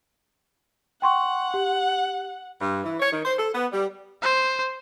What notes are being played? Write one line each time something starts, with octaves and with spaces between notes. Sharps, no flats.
F#5 G5 C6 C#6
G4
G2
E3
C#5
D#3
C5
A4
B3
G3
C5